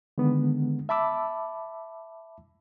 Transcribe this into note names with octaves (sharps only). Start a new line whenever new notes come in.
D3 D#3 G#3 B3
E5 A5 B5 D6 E6